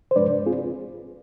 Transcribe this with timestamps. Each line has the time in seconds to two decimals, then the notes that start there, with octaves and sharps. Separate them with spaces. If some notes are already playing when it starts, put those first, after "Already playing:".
0.11 C5
0.16 G2 F3 G#3 D4 B4 D5
0.46 C4 F4 G#4